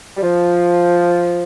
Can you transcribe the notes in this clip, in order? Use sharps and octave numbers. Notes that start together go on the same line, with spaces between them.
G3
F3